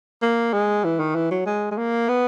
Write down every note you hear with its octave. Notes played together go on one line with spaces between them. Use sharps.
A#3
G#3
E3
D#3
E3
F#3
G#3
G#3
A#3
B3